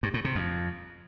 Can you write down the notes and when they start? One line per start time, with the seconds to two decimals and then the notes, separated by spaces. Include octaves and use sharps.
0.03 G2
0.14 A2
0.25 C3
0.35 F2